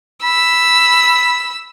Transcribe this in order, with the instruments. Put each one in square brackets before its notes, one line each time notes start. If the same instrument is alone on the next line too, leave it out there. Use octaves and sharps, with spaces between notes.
[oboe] B5 [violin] E6